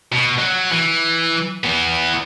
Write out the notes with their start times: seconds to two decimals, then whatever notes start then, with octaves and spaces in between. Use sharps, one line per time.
0.12 B2
0.38 F#3
0.72 E3
1.64 E3 B3